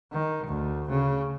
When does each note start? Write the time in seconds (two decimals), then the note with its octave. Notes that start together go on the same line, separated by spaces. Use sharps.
0.12 D#3
0.46 D2
0.90 C#3